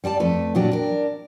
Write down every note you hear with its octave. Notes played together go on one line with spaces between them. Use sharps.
G3 D5 G#5 A5
F2 A3 B4
A#2 F#3 D4 G4
D4 A#4